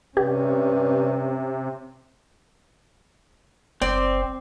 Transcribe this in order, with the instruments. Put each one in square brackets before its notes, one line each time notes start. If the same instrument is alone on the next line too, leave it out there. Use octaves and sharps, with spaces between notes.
[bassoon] G2 [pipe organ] C3 [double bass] C#4 [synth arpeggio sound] G4
[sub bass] F#1 [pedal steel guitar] C4 [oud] D5